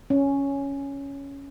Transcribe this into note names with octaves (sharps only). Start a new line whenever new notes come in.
C#4